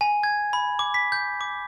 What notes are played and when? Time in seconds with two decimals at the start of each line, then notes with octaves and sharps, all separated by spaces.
0.01 G#5
0.23 G#6
0.53 B5
0.79 D6
0.94 B6
1.12 G6
1.41 D6